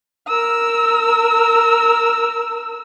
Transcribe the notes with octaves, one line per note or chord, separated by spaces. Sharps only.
A#4 E6